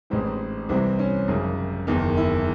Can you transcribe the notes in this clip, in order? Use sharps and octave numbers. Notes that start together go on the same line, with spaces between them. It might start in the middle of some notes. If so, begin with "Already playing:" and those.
A1 G#2 E3 C4
C2 C3 E3 C4
C#4
G#1 F#2 C#3
F#1 E2 D#3
E4